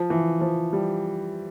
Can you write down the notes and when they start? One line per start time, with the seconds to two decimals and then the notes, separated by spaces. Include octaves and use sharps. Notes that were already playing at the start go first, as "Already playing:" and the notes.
Already playing: F3
0.10 E3
0.41 F3
0.73 G3